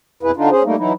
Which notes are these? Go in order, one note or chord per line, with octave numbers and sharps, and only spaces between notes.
F2 B2 E4 G#4 B4
D3 D4 D#4 F4
C#4 G#4 C5
G3 A3 A#3 D#4
E3 F#3 D#4 E4